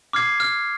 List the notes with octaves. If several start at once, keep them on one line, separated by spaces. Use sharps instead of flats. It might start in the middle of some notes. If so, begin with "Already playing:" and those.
D6 F6 G#6 C7
F6